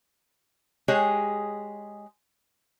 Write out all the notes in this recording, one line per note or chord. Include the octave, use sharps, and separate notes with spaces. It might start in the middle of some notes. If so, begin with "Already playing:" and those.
G#3 G4 G#4 C#5 D#5